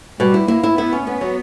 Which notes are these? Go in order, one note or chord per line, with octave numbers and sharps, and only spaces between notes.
B2 G3
E4
A#3 E4
E4
B3 E4
C#4
B3 C#4
F#3